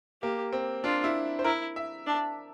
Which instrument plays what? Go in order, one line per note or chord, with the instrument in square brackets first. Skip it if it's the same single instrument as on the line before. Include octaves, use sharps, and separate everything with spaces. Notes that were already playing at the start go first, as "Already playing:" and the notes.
[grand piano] A#3 [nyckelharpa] G4
[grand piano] C4
[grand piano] D4 [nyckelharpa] F4
[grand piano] E4
C5
[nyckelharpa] E4 [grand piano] A#4
[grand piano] E5
[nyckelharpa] D4